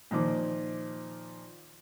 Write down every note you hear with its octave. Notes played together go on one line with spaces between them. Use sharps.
A#2 D#3 F3 D6